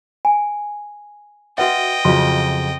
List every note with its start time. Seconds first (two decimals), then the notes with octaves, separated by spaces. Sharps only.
0.25 G#5
1.58 F#4 B4 D#5 E5 F#5 G5
2.05 F2 C#3 F#3 F4 C6